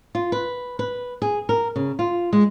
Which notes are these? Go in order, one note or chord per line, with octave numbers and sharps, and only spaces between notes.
F4
B4
B4
G#4
A#4
C#3
F4
G#3